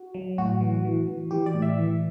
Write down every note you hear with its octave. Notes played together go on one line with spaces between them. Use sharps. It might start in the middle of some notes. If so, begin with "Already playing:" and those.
Already playing: F#4
F#3
A2 F#4
E3
E3
E3
E3 G4
D5
A2
E5
E3